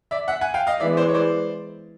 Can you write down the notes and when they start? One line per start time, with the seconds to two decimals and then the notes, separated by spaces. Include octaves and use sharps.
0.11 D5 E5
0.28 E5 F#5
0.41 F#5 G#5
0.54 F5 G5
0.67 D#5 F5
0.80 E3 G#3 B3 D5 E5
0.97 C5 D5
1.09 C#5
1.14 C5 D5